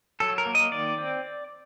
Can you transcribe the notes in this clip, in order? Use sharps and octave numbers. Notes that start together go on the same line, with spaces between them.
F#3 A4
A#4
A#3
D#5
D#3 D5
C4